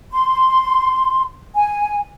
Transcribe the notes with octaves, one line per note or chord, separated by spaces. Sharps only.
C6
G#5